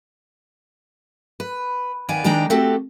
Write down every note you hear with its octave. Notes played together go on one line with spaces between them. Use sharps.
B4
D#2 D#3 B3 D5 G#5
D#3 G#3 D4 G5 A#5
A3 C4 F#4 G4 A4